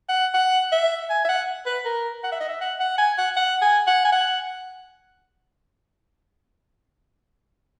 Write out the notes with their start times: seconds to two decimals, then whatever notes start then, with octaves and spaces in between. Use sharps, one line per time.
0.09 F#5
0.34 F#5
0.72 E5
1.10 G#5
1.25 E5
1.29 F#5
1.66 B4
1.85 A#4
2.23 F#5
2.32 E5
2.40 D#5
2.49 E5
2.61 F#5
2.80 F#5
2.98 G#5
3.18 F#5
3.37 F#5
3.62 G#5
3.87 F#5
4.05 G#5
4.12 F#5